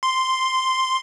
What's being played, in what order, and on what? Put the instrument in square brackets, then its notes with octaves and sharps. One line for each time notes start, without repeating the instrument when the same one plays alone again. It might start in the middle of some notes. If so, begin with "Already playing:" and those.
[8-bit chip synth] C6